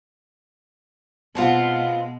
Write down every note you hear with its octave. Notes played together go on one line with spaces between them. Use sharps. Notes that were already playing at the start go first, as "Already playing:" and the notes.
B2 G#3 B3 C4 F4 F#5 A5